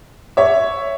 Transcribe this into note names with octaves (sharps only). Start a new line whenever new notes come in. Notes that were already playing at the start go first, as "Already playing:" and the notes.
C#5 E5